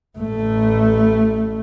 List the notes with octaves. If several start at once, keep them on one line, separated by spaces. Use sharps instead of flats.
A1 A3